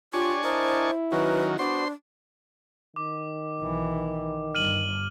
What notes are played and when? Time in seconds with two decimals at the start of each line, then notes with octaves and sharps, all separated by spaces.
0.13 D4 F4 G4 C#5 D5 G#5 C#6
0.44 E4 A#4 C5 D#5 A5
1.12 D#3 F#3 C#4 F#4 A#4 B4
1.59 B3 D4 F#4 C5 D5 C6
2.96 D#3 D6
3.60 B1 E3
4.55 G1 G2 F6 D#7 F#7